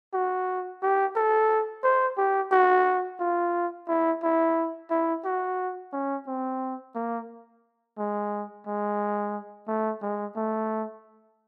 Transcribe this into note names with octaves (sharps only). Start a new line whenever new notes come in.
F#4
G4
A4
C5
G4
F#4
F4
E4
E4
E4
F#4
C#4
C4
A#3
G#3
G#3
A3
G#3
A3